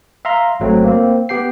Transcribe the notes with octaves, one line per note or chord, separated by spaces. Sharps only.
E5 F5 A#5 C6
G#1 F#3 A3 C4
A#3 C4
B3 G4 G5 C7